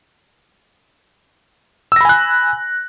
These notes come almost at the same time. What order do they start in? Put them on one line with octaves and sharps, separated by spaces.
E6 A#6 B5 G#5 F#6